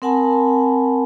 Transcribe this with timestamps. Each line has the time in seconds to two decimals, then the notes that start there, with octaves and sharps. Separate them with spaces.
0.02 C4 A#4 F#5 G#5 A5 B5